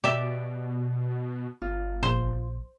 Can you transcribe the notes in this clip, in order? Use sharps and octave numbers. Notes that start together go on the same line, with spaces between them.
B2 G4 D5 E5
G1 F4
A#1 C5